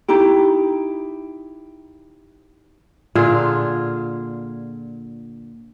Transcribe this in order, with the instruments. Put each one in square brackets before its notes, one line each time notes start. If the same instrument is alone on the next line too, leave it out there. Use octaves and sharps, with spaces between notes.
[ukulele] D#4 E4 G4
[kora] A#2 D3 F4 G#4